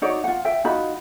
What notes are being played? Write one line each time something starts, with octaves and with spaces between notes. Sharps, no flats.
D#4 F#4 C#5 D5
F4 F#5
E5 G5
D#4 F4 F#4 B5